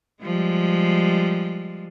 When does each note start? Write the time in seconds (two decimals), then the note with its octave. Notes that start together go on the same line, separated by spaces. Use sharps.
0.23 F3 G3 G#3